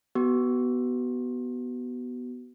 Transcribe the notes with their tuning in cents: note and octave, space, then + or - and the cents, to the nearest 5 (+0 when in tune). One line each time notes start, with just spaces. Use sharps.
B3 +0 F#4 +35